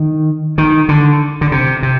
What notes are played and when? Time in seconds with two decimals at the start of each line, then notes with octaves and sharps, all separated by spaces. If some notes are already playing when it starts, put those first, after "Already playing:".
Already playing: D#3
0.58 D#3
0.89 D3
1.41 D3
1.52 C3
1.83 C3